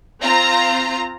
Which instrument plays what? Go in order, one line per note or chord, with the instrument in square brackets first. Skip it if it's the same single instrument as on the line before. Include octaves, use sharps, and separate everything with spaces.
[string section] C4 F4 A#5